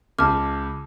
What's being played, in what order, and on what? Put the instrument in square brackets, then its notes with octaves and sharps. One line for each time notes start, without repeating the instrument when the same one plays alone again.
[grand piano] C#2 [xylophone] A5 F6 [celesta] D6